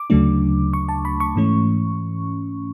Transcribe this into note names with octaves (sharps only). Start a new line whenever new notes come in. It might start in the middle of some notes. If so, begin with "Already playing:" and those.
Already playing: D6
D2 C#3 F#3 A3 D4
C#6
A5
B5
C#6
G#2 E3 A3 C#4